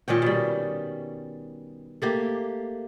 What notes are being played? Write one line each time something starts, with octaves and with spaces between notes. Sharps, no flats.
A#2 D#3 C#4 G5
B2 G3
A3 A#3 G4